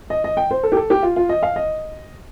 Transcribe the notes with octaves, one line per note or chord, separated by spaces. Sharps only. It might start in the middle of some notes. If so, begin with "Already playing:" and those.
D#5
D#5
G5
C5
A4
G4
A4
G4
F4
F4
D#5
F5
D#5